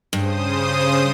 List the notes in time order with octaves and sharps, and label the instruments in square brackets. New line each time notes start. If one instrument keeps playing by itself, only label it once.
[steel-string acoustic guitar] G2 [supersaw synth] C#3 C5 D#6